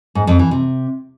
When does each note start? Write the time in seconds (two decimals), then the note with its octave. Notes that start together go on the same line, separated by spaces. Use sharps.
0.15 G#2
0.27 F2
0.39 E3
0.51 C3